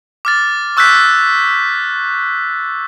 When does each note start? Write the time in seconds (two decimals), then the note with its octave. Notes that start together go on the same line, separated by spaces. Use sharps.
0.25 D6 F6 A6
0.77 C#6 E6 F#6 G6 B6